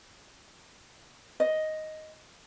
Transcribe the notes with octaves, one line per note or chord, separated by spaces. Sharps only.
D#5